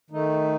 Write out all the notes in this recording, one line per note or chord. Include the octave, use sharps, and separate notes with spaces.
D#3 A3 D#4